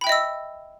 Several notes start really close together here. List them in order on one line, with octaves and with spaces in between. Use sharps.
B5 G5 E5 D#5 E6